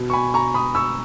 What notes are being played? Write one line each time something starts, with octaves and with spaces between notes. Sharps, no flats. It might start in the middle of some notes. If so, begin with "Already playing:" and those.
Already playing: B2
C#6
G#5 B5
A#5 C#6
B5 D#6
C#6 E6